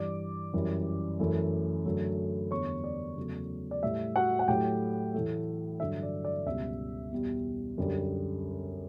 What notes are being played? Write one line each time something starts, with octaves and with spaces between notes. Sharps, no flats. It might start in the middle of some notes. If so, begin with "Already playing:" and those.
Already playing: G2 E3 G3 D5 D6
F#2 E3 G3
F#2 E3 A3
F#2 D3 F#3 A3
E2 D3 G3 C#5 C#6
D5
E2 C#3 F#3 A3
D5
A2 G3 E5
F#4 F#5
F#5
A2 F#3 A3 G4 G5
A2 E3 A3
G2 D3 F#3 E5
D5
D5
C#2 B2 G3 E5
E2 B2 G3
F#2 D3 G3